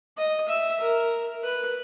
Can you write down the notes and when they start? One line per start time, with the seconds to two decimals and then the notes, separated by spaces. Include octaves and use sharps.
0.17 D#5
0.48 E5
0.80 A#4
1.43 B4